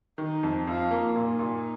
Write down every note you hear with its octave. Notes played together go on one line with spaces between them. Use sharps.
D#3 D#4
F2
F2 F4
A#3
A#2 D#4
A#2